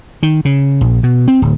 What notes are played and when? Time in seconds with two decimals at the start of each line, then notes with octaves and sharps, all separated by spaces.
0.23 D#3
0.45 C#3
0.81 A#1
1.03 B2
1.28 C4
1.42 D1